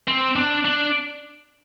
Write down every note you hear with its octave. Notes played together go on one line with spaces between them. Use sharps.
C4
D4
D4